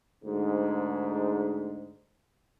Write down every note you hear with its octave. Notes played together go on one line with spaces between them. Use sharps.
D2 G#2